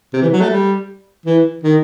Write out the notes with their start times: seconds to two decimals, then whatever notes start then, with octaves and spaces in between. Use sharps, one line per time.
0.13 C3
0.22 E3
0.32 F#3
0.41 A3
0.50 G3
1.26 E3
1.63 D#3